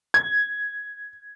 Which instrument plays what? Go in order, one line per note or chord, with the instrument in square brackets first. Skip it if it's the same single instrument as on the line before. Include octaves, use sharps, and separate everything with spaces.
[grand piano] G#6